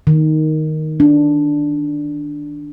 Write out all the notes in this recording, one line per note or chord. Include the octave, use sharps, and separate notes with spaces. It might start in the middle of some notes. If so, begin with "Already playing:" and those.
D#3
D4